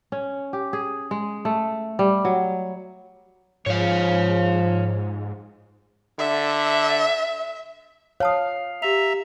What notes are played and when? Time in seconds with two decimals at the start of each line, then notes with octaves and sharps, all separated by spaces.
0.12 C#4
0.53 G4
0.73 G#4
1.11 G#3
1.45 A3
1.99 G3
2.25 F#3
3.67 G#2 F3 C#5 F5
6.19 D3 E5
8.20 C#5 F5 A5 D#6
8.82 G4 E5 A#5 F7